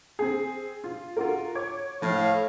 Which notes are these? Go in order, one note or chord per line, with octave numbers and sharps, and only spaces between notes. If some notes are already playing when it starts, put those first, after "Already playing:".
C4 G#4
F4
F4 F#4 A#4
C#5 D6 G#6
A2 F3 F5